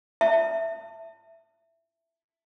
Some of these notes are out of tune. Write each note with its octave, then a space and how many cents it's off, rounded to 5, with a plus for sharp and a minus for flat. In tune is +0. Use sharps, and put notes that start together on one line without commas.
E5 +0 A5 +25